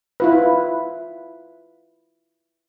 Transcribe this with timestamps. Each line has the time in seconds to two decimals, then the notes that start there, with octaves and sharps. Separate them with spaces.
0.20 E4 F4 B4